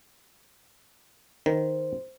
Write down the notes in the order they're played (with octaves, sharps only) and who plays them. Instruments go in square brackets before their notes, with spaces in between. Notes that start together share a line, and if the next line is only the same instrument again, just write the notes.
[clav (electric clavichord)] D#3 [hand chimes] C5